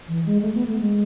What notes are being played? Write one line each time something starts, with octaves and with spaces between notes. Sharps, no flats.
E3
G#3
A3
B3
A3
G#3